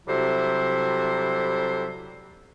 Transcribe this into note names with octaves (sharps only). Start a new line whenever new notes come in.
C3 F#3 G3 E4 A4 C5